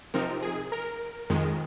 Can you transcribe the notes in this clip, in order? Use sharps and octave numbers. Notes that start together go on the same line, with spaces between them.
C3 F3 C4 D#4 A#4
G#4
A#4
F2 D#3 G#3